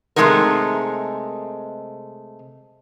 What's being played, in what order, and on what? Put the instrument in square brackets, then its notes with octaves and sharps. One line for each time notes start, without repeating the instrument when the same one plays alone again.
[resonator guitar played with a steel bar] C3 D#3 G#3 A3 D#4 A#4